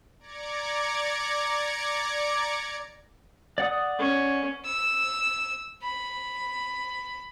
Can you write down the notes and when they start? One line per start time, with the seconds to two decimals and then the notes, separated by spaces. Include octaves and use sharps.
0.20 D5 A#5 D6 G#6 C#7
3.58 D5 F#5 D#6
3.99 C#4
4.66 E6
5.83 B5